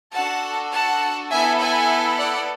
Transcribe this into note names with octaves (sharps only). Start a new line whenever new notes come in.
D4 F#4 A4 F#5 A5
F#5 A5
B3 E4 A4 E5 G#5
E5 G#5
D5 F#5